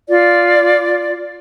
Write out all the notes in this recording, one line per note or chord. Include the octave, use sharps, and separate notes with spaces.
F4 D5